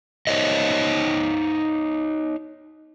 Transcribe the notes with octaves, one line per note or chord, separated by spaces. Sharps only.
D#4 C5 C#5 D#5